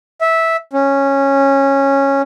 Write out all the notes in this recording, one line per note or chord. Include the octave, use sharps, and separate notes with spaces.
E5
C#4